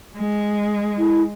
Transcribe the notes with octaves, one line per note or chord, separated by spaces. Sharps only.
G#3
E4